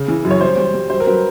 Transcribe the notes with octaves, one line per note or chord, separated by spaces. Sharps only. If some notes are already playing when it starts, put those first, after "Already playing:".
Already playing: C#3
E3
F#2
C#5
G3 C5
G3
G3
F#3 C5
A#4
F#3 B4